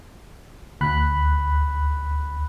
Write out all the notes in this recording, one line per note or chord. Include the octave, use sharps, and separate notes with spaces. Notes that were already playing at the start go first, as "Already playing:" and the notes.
D2 B5 F#6